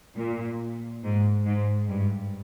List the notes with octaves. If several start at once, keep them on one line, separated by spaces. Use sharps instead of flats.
A#2
G#2
G#2
G2